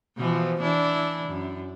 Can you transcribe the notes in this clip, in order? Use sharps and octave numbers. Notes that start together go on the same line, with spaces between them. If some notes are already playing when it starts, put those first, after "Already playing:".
B2 E3 F3
E3 D4 E4
F#2